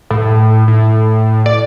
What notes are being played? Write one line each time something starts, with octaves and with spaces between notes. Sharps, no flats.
A2
A2
D5